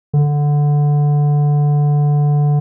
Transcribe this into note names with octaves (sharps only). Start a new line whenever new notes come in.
D3